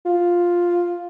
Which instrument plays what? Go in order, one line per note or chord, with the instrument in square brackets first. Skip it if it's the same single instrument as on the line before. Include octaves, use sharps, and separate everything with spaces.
[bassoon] F4